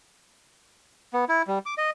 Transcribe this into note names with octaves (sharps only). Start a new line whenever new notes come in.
B3
E4
G3
D6
D#5